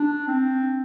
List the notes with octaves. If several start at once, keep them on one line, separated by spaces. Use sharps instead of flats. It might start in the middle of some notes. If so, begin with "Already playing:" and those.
Already playing: D4
C4